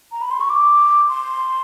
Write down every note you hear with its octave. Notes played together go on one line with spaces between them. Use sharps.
A#5
B5
C6
C#6
D6
C6